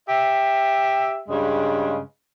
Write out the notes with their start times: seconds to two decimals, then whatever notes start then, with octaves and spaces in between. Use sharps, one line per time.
0.09 G4 E5
1.28 G2 C#3 G#3